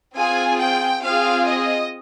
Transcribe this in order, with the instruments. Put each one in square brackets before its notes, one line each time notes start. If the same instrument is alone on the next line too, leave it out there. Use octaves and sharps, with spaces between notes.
[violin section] C4 F4 G#4 G#5
G5
C4 F4 G#4 F5
D#5